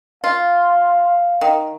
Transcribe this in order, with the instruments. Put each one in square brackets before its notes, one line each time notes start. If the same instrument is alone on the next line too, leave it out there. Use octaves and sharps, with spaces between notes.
[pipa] F4 [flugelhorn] F5
[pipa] D#3